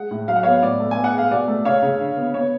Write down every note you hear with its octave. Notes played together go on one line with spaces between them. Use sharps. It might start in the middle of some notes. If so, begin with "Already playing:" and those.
Already playing: G#3 F#5
A2
F#3 F5
F#5
B3 C#5 F5
A2 D5
A3
G#5
B3
F#5
G#3 F5
B2 D5
A3
C#3 C#5 F5
C#3
D3
B3
B3 C#5